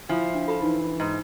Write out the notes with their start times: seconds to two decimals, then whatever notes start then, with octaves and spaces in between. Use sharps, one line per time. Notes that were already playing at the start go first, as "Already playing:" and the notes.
0.09 F3 E4 G#5
0.34 D4
0.48 F4 A4 B5
0.62 E3 D#4
1.00 G#2